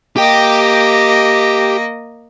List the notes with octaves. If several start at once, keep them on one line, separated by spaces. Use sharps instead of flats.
A#3 G4 D#5 G5